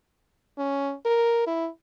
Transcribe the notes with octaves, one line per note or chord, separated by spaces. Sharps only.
C#4
A#4
E4